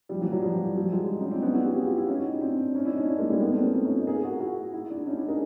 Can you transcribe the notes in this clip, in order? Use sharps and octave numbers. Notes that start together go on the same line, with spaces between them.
F3 G3
E3 F#3
E3 F#3
F3 G3
F3 G3
F#3 G#3
C#4 D#4
C4 D4
B3 C#4
E4 F#4
F4 G4
F#4 G#4
F4 G4
E4 F#4
C#4 D#4
C4 D4
C#4 D#4
D4 E4
C#4 D#4
D4 E4
G#3 A#3
G3 A3
A3 B3
A#3 C4
B3 C#4
C#4 D#4
C#4 D#4
D#4 F4
G#4 A#4
F#4 G#4
E4 F#4
E4 F#4
D4 E4
C#4 D#4
D4 E4
G#4 A#4